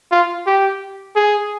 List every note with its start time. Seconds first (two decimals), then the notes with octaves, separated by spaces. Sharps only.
0.11 F4
0.46 G4
1.16 G#4